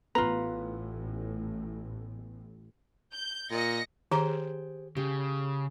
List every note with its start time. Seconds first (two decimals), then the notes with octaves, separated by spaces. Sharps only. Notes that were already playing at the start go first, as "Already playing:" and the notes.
0.15 A1 A2 B3 F4 B4 A#5
3.13 G6
3.51 A#2 D#5 A#6 C#7
4.11 D#3 G4 G#4 C5 A#5 D6
4.97 C#3 G4